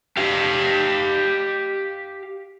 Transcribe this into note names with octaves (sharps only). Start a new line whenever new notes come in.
G4 F5